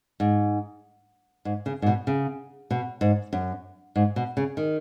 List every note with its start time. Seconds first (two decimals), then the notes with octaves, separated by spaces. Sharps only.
0.20 G#2
1.45 G#2
1.66 C#3
1.82 G#2
1.87 B2
2.07 C#3
2.71 B2
3.01 G#2
3.33 F#2
3.96 G#2
4.16 B2
4.37 C#3
4.57 D#3